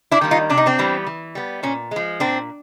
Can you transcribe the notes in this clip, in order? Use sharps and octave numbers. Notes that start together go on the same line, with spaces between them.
D4 E4
D#3 G3 A#3
D#4 F4
C3 D4
D#4
C4 D4
E3 G3 B3
E3
G3 B3
A#2 C#4
F3 G#3
A#2 C4 D4